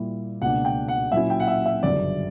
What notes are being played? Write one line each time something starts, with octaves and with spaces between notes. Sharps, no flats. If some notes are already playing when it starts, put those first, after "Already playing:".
Already playing: A#2 G3 A#3 E4
C#2 B2 A#3 D4 F#5
G5
F#5
A#2 F#3 A#3 C#4 E4 E5
G5
F#5
E5
E5
G1 F#2 C#3 F#3 D5